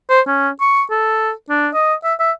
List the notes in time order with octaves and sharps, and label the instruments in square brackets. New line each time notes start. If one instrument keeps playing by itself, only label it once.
[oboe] C5
C#4
C#6
A4
D4
D#5
E5
E5